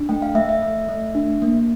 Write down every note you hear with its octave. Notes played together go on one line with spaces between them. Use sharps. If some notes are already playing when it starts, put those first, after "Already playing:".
Already playing: D4
A3 G5
F5
A3 E5
E5
A3
A3
D4
A#3